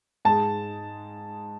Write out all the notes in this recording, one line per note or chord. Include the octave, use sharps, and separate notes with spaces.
G#2 G#3 A5